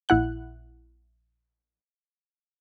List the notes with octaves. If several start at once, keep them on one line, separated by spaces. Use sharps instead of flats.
A#1 E4 F#5 F#6